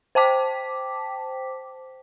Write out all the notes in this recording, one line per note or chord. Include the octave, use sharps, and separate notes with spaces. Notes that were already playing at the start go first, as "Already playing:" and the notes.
C5 G5 A5 D6 B6